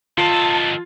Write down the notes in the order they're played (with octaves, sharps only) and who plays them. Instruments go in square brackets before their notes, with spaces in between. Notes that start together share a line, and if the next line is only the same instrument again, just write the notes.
[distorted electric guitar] D#3 A4 [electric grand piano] F4 C7 [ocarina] A5